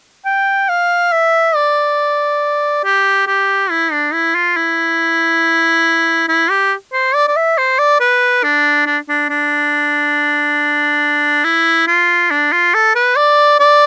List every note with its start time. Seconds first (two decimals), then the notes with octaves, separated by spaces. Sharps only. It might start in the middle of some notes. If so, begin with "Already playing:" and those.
0.25 G5
0.69 F5
1.12 E5
1.55 D5
2.84 G4
3.27 G4
3.70 E4
3.92 D4
4.13 E4
4.35 F4
4.56 E4
6.28 E4
6.50 G4
6.93 C5
7.15 D5
7.27 D5
7.36 E5
7.58 C5
7.79 D5
8.00 B4
8.43 D4
8.86 D4
9.09 D4
9.29 D4
11.44 E4
11.87 F4
12.31 D4
12.52 F4
12.74 A4
12.95 B4
13.16 D5
13.60 D5